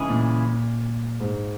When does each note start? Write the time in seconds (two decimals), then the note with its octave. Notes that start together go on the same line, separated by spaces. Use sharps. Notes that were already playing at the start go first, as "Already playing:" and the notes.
Already playing: C#3 E3 G#3 E4 G#4
0.10 A#2
1.20 G#2